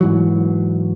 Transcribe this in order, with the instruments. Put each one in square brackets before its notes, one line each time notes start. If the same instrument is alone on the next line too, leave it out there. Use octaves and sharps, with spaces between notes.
[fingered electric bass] G#2 E3 F#3